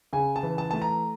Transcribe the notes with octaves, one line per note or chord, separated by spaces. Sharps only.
C#3 G#5
A5
E3
A5
A3 A5
A#5